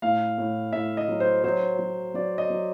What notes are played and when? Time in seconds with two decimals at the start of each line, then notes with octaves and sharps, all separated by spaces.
0.02 A2 F5
0.38 A2
0.73 A2 E5
0.97 D#5
1.08 F#3
1.20 C5
1.44 F#3 C5
1.79 F#3
2.14 F#3 D5
2.38 D#5
2.50 F#3